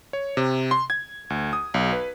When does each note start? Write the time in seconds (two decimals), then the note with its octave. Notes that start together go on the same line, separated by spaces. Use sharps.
0.13 C#5
0.37 C3
0.71 C6
0.90 G#6
1.30 D2
1.53 D#6
1.74 B1
1.93 B4